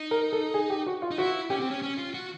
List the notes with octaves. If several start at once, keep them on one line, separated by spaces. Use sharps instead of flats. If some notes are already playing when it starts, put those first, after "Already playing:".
Already playing: D#4
A#4
A4
G#4
G4
F#4
F4
D#4
E4 F#4
C#4 G4
C4
C#4
C#4
F4
F#4